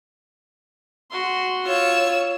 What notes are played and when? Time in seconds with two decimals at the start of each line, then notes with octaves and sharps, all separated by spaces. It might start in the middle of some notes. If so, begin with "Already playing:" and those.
1.11 F#4 C6
1.67 F4 C#5 E6